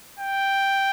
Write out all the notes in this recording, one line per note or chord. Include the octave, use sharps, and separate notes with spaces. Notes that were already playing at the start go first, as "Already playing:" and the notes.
G5